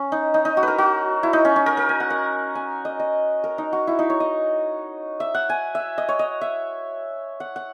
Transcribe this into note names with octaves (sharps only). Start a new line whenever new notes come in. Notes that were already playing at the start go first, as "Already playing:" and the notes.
Already playing: C#4
D#4
D#4
D#4
F#4
A#4 B4
F#4
E4
D#4
C#4
C#4
A#4
A#4
G#5
F#5
F#5
G#5
D#5
D#5
A#4
D#4
F#4
E4
D#4
C#5
D#5
E5
F#5
G#5
E5
D#5
C#5
D#5
E5
F#5
F#5